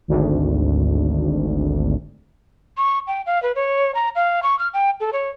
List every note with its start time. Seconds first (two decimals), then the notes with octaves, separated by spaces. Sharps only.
0.08 G#1 D2
2.77 C#6
3.07 G5
3.26 F5
3.43 B4
3.55 C#5
3.95 A#5
4.16 F5
4.43 C#6
4.59 F6
4.74 G5
5.00 A4
5.13 C#5